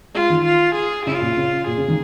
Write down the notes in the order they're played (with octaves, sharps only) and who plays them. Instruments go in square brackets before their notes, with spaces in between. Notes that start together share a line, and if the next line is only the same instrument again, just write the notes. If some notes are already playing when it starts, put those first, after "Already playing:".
[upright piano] G#3 [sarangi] F4
[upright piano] D#3
[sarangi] F4
G#4
[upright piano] C#3 [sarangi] F4
[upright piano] A#2
C#3
[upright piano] A#2 [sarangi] G#4
[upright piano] C#3
D#3